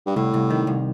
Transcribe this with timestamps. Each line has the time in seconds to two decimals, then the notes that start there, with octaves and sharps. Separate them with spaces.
0.07 G2
0.16 C2 A2
0.34 C2
0.50 D#3
0.67 C2